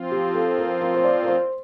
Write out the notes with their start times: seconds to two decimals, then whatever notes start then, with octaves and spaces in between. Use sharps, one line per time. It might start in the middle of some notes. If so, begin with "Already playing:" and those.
Already playing: F3 C4 F4
0.11 G4
0.34 A4
0.58 A#4
0.81 A#4
0.94 C5
1.04 D5
1.23 A#4
1.28 C5